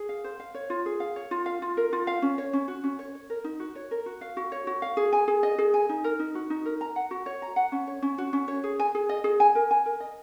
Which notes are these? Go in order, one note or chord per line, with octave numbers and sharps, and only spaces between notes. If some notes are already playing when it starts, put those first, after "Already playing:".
Already playing: G#4
F5
C5
F5
C#5
F4
G#4
F5
C#5
F4
F5
F4
A#4
F4
F5
C#4
C#5
C#4
F#4
C#4
C#5
C#5
A#4
D#4
F#4
C#5
A#4
F#4
F5
F#4
C#5
F#4
F5
G#4
G#5
G#4
D#5
G#4
G#5
D#4
A#4
D#4
F#4
D#4
A#4
A#5
F#5
F#4
C#5
A#5
F#5
C#4
C#5
C#4
F#4
C#4
C#5
G#4
G#5
G#4
D#5
G#4
G#5
A#4
G#5
A#4
D#5